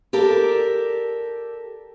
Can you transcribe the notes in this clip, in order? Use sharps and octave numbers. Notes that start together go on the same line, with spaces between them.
G4 A4 A#4 D5